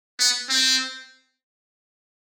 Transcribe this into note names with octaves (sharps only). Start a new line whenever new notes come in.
B3
C4